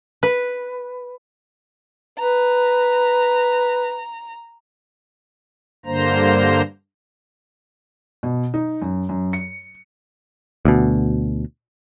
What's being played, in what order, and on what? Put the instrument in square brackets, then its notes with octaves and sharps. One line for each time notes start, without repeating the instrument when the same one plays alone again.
[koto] B4
[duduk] B4 [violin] A#5
[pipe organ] G2 D3 A#3 C5 A#5
[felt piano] B2
D#4
F#2
F#2
C#7
[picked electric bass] D2 B2